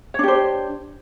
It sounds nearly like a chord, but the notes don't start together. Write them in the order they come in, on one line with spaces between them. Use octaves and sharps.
C#5 D4 G4 C5